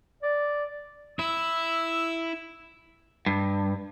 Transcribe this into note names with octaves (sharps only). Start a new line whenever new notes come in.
D5
E4 E6
G2